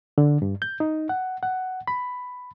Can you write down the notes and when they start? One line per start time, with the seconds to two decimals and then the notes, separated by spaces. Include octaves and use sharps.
0.18 D3
0.42 G2
0.62 G6
0.80 D#4
1.09 F#5
1.43 F#5
1.88 B5